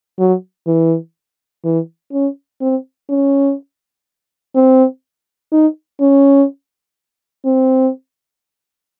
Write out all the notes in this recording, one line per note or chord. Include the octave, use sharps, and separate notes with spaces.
F#3
E3
E3
C#4
C4
C#4
C4
D#4
C#4
C4